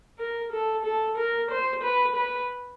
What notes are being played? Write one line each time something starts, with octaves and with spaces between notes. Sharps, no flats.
A#4
A4
A4
A#4
C5
B4
B4